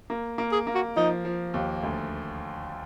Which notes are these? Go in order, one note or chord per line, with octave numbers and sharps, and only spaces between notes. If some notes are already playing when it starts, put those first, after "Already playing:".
A#3
A#3
G#4
A#3
F#4
F3 D#4
F3
D#2
D2